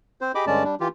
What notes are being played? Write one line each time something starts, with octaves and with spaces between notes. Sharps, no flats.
C4 C5
G4 G#4 D#5 B5 D6
G2 D3 G#3 C#4 D5 A5
G3 D4
E3 F4 G4